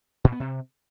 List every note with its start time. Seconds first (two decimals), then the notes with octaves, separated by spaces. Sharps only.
0.24 A#2
0.32 B3
0.40 C3